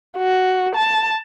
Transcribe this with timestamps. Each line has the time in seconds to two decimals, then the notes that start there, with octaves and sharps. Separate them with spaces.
0.18 F#4
0.76 A5